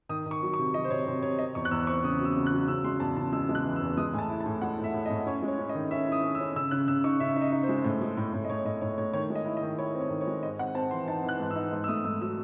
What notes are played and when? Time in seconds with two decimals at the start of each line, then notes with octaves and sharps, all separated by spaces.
0.09 D#3 D#6
0.26 D#3
0.31 C#6
0.43 F#3
0.54 C#6
0.59 C3
0.74 F#3 D#5
0.84 C5
0.91 C3 C#5
1.07 C3 C5
1.23 C3 C#5
1.39 C4 D#5
1.55 E2 C#6
1.65 F#6
1.71 E2 E6
1.87 C4 C#6
2.03 C#3 D#6
2.20 F#3 E6
2.36 C#3
2.46 F#6
2.52 F#3
2.68 C#3 E6
2.84 G#3 C6
3.00 E2 A5
3.17 C#3 A5
3.33 G#3 E6
3.49 G#3
3.55 F#6
3.65 E3
3.76 E6
3.82 E2
3.97 G#3 D#6
4.13 A2 G#5
4.19 A5
4.30 E4
4.41 A5
4.46 A2
4.62 G#3 F#5
4.79 A2
4.84 E5
4.94 A2
5.06 D#5
5.10 A2
5.26 C#4 C#5
5.42 G#3
5.48 C#5
5.59 C#4
5.69 D#5
5.75 D#3
5.91 C#4 E5
6.07 E4 D#6
6.23 C#4
6.35 E6
6.40 C#4
6.56 C#3 E6
6.71 C#3 F#6
6.88 C#3 E6
7.04 D#4 C#6
7.20 C#3 E5
7.36 D#4
7.42 D#5
7.52 D#4
7.63 C5
7.69 G#3
7.84 A2
8.01 G#3
8.17 A2
8.33 A2
8.44 D#5
8.50 A2 C#5
8.65 A2 D#5
8.81 A2 C#5
8.98 A2 C#5
9.14 D#3 C#5
9.30 G#3
9.35 D#5
9.46 E4
9.57 D#5
9.63 D#3
9.78 E4 C#5
9.94 C4
10.01 C#5
10.10 D#3
10.21 C#5
10.27 G#3
10.43 G#2 D#5
10.59 C4 F#5
10.75 C4 A5
10.91 E3 C6
11.07 D#4 A5
11.24 E3 F#6
11.40 G#2
11.51 E6
11.56 D#4
11.73 G#2
11.84 E6
11.88 A3 D#6
12.05 G#2 E6
12.21 F#3 E6